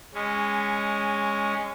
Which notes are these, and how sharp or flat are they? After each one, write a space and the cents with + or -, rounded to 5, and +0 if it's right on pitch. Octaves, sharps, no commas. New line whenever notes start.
G#3 -10 C#4 +0